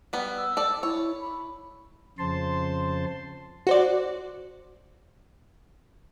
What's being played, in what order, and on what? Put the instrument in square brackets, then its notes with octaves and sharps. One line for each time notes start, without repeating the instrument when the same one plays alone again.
[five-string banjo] G3 B3
[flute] E6
[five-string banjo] A4 D5
[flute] E4 [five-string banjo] C#5
[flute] B5
[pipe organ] F2 C#3 C5 A5 C6
[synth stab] F#4 C5 D5